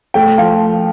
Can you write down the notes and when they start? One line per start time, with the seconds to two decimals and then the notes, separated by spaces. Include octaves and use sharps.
0.14 A3 G5
0.38 F3 F5